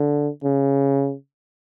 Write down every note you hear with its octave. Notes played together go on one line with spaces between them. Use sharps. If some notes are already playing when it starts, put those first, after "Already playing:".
Already playing: D3
C#3